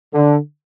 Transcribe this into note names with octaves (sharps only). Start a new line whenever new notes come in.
D3